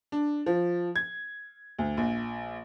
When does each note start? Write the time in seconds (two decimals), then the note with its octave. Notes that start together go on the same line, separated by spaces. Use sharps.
0.12 D4
0.46 F3
0.96 G#6
1.79 D2
1.97 A#1